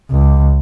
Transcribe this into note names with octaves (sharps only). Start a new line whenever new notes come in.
C#2